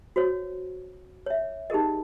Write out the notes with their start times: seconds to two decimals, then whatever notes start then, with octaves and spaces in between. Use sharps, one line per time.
0.16 F#4 C5 C#5
1.26 C#5 E5
1.70 D#4 G4 G#4 A#4 D#5